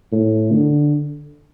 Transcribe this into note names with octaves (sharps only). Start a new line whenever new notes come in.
A2
D3